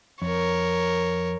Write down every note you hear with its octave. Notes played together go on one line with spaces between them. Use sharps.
F2 A#4 C#5